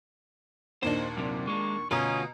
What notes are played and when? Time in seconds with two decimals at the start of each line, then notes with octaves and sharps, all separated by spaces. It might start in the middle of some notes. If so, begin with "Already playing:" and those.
0.83 D#2 A#2 D4 C5 D#5
1.17 F#2 C3
1.47 G#3 A#3 C#6
1.91 D2 B2 C#4 F4 A#5 D#6